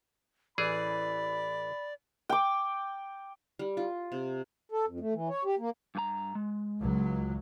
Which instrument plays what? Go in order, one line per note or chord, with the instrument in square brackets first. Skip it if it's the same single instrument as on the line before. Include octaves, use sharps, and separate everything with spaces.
[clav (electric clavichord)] A1 E3 G#4 [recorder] D5 [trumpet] B5
[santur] G5 D6
[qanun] G3
F4
C3
[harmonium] A4
F2
A3
E3
C#5
G4
A#3
[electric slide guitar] G2 F#4 A#5
G#3
[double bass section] C#2 F#3